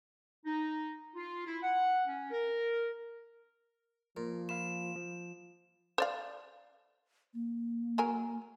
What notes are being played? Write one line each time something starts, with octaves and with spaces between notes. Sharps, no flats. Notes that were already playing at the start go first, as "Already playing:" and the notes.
D#4
F4
E4
F#5
C#4
A#4
A#2 F3 A#4
F5 B5 C6 E7
F3
C5 D5 F5
A#3
F#3 A#4 G#5